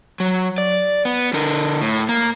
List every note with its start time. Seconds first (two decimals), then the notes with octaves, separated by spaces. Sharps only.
0.20 F#3
0.58 D5
1.05 B3
1.34 D3 A#4
1.82 A2
2.09 A#3